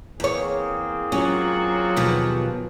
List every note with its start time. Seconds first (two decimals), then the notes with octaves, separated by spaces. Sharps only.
0.20 E2 A#3 C4 G#4 C#5
1.12 F#3 C#4 F4 F#4
1.96 D#2 B2 F3